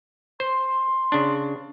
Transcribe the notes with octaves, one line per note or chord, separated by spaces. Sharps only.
C5 C6
C#3 D4